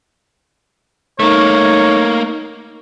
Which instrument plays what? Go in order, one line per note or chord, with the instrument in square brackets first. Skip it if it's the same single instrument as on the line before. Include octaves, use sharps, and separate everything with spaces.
[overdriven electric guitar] A3 A#3 [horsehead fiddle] D#4 [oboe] C#5